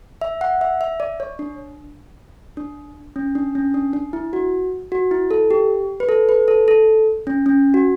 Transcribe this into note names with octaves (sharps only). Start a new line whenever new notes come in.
E5
F#5
E5
E5
D5
C#5
D4
D4
C#4
D4
C#4
D4
D4
E4
F#4
F#4
E4
A4
G4
B4
A4
B4
A4
A4
C#4
C#4
F#4